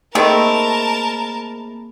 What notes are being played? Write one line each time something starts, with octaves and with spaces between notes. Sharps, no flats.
D#3 A3 A#3 C4 G#4 A#4 A5 B5